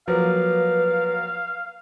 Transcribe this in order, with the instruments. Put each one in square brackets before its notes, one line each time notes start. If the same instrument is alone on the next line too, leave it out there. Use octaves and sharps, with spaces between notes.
[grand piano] F3 F#3 A#3 [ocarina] B4 [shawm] F5